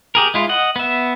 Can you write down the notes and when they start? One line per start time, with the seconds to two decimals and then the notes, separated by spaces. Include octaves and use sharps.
0.15 G4 G#4 A#4
0.34 G#3 E4 F4
0.49 D#5 F#5
0.76 B3 E5